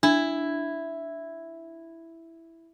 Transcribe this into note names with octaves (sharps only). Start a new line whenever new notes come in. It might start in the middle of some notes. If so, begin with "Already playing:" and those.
D4 E4